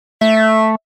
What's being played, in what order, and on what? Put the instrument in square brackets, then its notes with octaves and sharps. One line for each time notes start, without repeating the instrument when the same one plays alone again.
[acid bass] A3 [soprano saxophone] E5